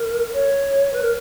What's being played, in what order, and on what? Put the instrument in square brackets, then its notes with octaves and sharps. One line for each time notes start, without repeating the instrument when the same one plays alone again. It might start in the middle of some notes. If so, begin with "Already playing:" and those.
Already playing: [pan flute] A#4
C#5
B4
A#4